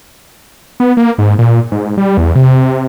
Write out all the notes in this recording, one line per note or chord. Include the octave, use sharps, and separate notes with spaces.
B3
A#3
G#2
A#2
G#2
G3
E2
C3